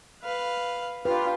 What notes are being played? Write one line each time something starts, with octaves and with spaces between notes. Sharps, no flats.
B4 F5
D4 F4 G4 B4 F5